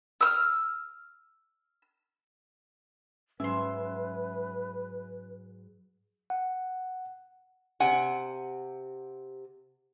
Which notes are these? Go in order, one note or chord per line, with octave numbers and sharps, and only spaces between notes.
E6 F6
G#2 F#3 C#4 B4 E5 C6
F#5
C3 F#5 G#5